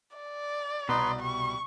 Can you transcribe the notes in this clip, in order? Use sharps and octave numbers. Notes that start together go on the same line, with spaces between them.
D5
C2 B2 D#4 B4 C6
G3 C#6